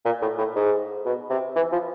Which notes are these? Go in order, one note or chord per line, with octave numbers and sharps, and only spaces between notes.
A#2
A2
A2
G#2
B2
C3
E3
F3